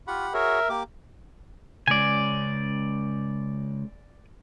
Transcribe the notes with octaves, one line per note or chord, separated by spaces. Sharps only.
F4 G4 F#5 B5 C#6
F#4 G#4 A#4 C#5 E5
A#3 G4 D6
C#3 G#3 D5 G#5